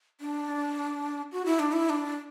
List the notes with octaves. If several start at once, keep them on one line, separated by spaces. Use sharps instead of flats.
D4
F#4
E4
D4
E4
D4